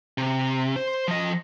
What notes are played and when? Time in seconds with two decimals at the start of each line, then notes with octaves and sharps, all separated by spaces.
0.18 C3
0.76 C5
1.08 F3 D#5